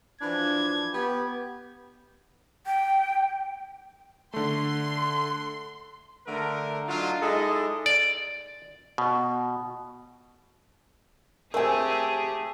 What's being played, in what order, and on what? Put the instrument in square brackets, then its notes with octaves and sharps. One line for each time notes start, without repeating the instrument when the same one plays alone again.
[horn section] E3 F3 D4 [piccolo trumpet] G#6
[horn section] B3 G4
[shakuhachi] G5
[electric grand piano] D3 A3 [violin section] C6
[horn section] D3 A3 A#4
F#3 D4 D#4 F4
G#3 D#4 E4 A4 D5 D#5
[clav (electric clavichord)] D5
B2
[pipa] A3 C4 [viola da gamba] G4 G#4 [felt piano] A#4 G#5